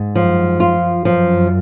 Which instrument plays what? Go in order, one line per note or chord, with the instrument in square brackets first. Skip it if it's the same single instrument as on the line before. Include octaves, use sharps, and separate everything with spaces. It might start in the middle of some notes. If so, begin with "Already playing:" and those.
Already playing: [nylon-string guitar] G#2
[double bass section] F#2 [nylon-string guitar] F3
[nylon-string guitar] F4
[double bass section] F#2 [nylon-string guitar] F3